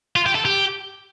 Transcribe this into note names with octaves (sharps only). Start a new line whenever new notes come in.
F4
G4
A4
G4